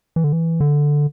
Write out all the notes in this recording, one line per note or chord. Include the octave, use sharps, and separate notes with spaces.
E3
D3
E3
D3